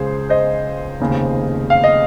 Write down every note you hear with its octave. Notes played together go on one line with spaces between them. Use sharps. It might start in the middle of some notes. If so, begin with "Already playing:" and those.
Already playing: C#2 C#3 G#4 C5
C5 D#5
F1 D#2 C#3
F5
D#5